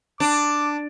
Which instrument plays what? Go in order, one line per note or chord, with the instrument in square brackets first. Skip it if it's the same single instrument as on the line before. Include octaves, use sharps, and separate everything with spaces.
[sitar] D4 [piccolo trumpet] D6